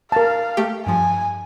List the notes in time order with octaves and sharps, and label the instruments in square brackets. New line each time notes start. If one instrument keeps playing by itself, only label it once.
[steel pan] A#4 A5 [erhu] F5
[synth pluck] A3 G4
[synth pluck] G2 F3 [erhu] G#5